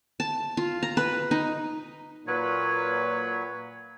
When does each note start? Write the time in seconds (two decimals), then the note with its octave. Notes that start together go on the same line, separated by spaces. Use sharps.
0.20 A5
0.57 F4
0.83 A#5
0.97 B4
1.31 D#4
2.27 A#2 F#3 B4 C#5